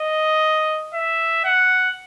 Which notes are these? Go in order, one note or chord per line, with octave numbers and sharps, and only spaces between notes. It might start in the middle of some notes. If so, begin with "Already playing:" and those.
Already playing: D#5
E5
F#5